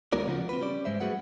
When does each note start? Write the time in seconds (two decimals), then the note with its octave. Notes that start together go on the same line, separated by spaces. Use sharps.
0.13 D#2 G#3 B3 F#4 A#4 D5
0.27 C#3 F3 C#4 F4 F#4
0.49 C4 B4
0.61 G3 C#4 D5
0.85 G#2 G#3 C5 E5
1.00 G3 A3 F#4 G#4 B4 F#5